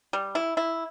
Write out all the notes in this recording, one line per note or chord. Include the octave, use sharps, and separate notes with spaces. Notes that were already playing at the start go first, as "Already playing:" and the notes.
G3
E4
E4